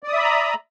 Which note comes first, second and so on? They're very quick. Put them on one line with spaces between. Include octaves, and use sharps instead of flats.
D5 D#6 E5 B5 A#5